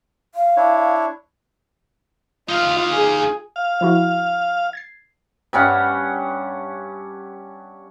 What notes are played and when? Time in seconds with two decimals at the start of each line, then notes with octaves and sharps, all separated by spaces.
0.35 F5
0.57 D4 E4 C#5
2.49 D#4 F4 F5
2.92 G#4
3.56 F5
3.81 F3 E4 F#4
4.73 G#6 A6 C7
5.53 G2 G3 C#4 F#5